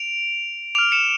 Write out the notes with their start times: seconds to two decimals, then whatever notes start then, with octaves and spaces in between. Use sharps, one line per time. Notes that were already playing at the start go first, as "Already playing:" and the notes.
Already playing: D7 F7
0.75 D6 F6 D7 F7
0.92 C#7 E7